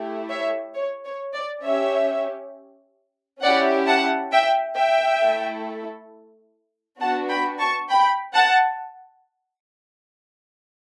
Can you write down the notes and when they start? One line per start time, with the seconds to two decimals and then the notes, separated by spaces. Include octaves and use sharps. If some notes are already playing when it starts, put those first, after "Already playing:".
Already playing: A3 E4 G4
0.30 C#5 E5
0.75 C#5
1.05 C#5
1.34 D5
1.64 C#4 G4 C#5 E5
3.42 C#4 E4 G4 D5 F#5
3.87 F#5 A5
4.32 E5 G5
4.77 E5 G5
5.21 A3 E4 A4
7.00 B3 D4 F#4 F#5 A5
7.29 G5 B5
7.60 A5 C#6
7.89 G5 B5
8.34 F#5 A5